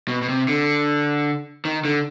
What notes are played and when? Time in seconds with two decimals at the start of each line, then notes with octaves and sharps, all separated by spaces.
0.08 B2
0.22 B2
0.29 C3
0.48 D3
1.65 D#3
1.85 D3